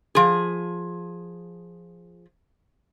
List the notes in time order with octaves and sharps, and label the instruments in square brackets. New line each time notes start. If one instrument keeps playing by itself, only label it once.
[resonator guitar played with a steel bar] F3 G#4